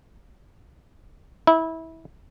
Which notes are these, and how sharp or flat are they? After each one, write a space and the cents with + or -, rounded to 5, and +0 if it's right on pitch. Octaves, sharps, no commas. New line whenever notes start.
E4 -25